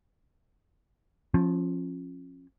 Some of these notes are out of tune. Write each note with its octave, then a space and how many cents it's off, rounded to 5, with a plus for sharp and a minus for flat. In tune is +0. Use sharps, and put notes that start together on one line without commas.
F3 +0 C#4 -30